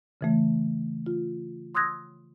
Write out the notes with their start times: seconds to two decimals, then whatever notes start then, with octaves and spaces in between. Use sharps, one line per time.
0.21 C#3 E3 A3
1.06 F4
1.75 C6 D#6 E6 F#6 G#6 A#6